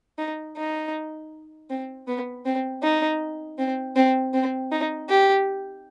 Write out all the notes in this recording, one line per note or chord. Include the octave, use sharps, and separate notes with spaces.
D#4
D#4
C4
B3
C4
D#4
C4
C4
C4
D#4
G4